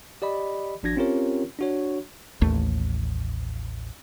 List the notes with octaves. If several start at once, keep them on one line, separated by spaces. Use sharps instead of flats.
G4 D5 D#5 B5
G#1 F3 D4 F#4 G#6 A#6
C4 C#4 F4 G4 A#4 C#5
D4 F#4 C#5
A1 D#2 A3